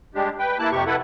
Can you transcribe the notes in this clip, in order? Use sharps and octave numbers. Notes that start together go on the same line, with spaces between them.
G3 G#3 D4 G4
B4 G5
A#3 E4 A5 F#6
F2 C3 G4 C#6
E4 A4 B4 F#5